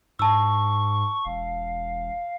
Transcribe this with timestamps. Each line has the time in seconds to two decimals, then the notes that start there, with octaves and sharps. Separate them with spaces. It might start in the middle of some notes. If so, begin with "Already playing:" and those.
0.19 G#2 A5 C#6 E6
1.26 E1 F5